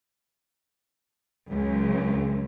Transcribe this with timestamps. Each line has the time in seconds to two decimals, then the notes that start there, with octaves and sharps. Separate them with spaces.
1.50 C#2 F#2